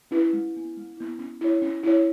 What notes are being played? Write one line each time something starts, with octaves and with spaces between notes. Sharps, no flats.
C#4 E4 B4
G#3
B3 E4
G#3
B3 E4
C#4
E4 C#5
C#4
E4 C#5